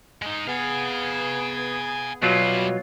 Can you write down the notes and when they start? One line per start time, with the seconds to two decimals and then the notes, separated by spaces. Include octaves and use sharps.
0.22 G#3 D#4
0.47 B3 G#4 F5 G#5
2.23 B2 F#3 G3 E4 F4